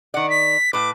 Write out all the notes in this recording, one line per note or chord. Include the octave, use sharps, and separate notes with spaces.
D#3 D5 F#5
B6
A2 B4 D6